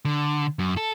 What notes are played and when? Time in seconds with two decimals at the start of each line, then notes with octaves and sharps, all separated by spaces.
0.05 D3
0.59 F#2
0.77 A4